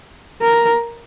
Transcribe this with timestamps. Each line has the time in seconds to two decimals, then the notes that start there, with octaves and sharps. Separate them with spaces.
0.42 A#4